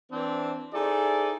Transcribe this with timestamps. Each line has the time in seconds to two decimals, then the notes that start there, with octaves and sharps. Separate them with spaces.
0.12 E3 C4 D4
0.74 D#4 E4 G#4 A4 C5 D5